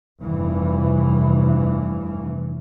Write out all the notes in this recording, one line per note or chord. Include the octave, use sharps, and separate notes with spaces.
F1 G2 E3